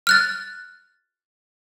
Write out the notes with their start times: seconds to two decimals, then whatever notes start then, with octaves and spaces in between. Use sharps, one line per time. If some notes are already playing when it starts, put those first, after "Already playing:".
0.07 F6 F#6 A6